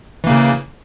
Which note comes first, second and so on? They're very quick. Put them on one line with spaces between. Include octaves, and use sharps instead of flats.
E3 A#3 C#3